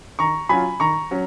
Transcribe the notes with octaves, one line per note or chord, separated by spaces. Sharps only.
D#3 A#5 C#6
F#3 C#4 F4 G#5 B5
D#3 A#5 C#6
F#3 C#4